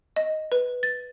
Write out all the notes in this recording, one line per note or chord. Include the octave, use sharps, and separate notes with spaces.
D#5
B4
A6